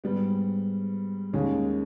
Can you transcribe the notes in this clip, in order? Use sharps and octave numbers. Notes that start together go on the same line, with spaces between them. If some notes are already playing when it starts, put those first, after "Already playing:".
G#2 G3 B3
D#2 D#3 G#3 C#4 G#4